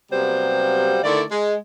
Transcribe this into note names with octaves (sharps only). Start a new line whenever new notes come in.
C3 F#3 G3 A#3 B3 C5
D3 D#3 A3 E4 D5
G#3